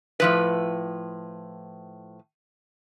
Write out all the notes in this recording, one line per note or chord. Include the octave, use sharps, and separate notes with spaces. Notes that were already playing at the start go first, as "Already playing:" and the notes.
A2 F3 B4